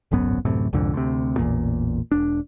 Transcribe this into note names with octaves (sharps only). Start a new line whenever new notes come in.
D1 G#1 F#2 B3
D1 F#2 A2 C3
C2 F2 G#2 D3
D2 C3
A1 E2 A#2
E1 D4